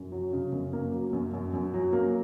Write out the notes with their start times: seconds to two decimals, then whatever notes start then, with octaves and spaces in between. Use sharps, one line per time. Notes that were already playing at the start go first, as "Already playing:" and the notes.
Already playing: F#2
0.12 F#3
0.33 C#3
0.52 F#2
0.73 A#3
0.92 F#3
1.13 F#2
1.34 F#2
1.54 F#2
1.74 F#3
1.93 A#3